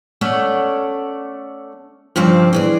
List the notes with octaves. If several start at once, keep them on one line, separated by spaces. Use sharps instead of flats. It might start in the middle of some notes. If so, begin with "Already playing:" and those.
A3 C#4 D5 F#5
G2 C#3 F3 C4 D5
E3 G#4 D5